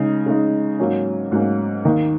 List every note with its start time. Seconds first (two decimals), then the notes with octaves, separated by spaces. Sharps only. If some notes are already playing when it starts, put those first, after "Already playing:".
Already playing: C#3 G#3 D#4
0.26 C#3 G#3 D#4
0.79 G#2 F#3 A#3 C#4
1.32 G#2 F#3 A#3 C#4
1.84 D#2 D#3 A#3